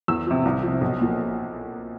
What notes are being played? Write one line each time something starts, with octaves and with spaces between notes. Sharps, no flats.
E2 E6
C3 F3
C2
C3 F3
B1
A#2 F3